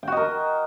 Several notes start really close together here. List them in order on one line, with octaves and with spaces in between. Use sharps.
G5 F#4 D#5 A#4